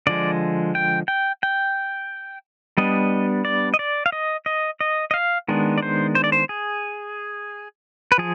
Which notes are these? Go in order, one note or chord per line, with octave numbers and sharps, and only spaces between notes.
D3 F3 G#3 D5
G5
G5
G5
G3 B3 D4 D#5
D5
D#5
D5
F5
D#5
D#5
D#5
D#5
F5
D#3 G#3 B3 D4
D5
C5
C5
D5
C5
G#4
B4
F3 G#4